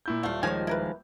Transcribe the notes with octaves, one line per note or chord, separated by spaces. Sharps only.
A#2 E4 G6
D#1 A3 F4 D5 F5
D#3 F3 G#3 C#5 G#5
E4 A#4 B4